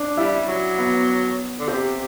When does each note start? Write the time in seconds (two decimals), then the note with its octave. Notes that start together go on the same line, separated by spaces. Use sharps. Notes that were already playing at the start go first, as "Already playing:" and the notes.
Already playing: D4
0.17 G3 E4
0.47 F#3
0.78 B3
1.59 D3
1.68 C3 G4